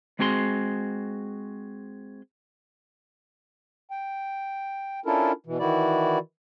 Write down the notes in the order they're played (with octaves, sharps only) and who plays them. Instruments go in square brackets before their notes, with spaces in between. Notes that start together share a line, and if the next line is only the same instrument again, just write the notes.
[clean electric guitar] G#3 C4 F#4 G#4 G5 C6
[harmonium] G5
C#4 D4 E4 F4 A4 A#4
B2 E3
D#3 E3 E4 F#4 D5